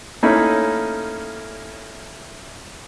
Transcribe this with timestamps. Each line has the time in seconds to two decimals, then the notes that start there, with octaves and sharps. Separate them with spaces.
0.23 A3 A#3 C#4 D#4 E4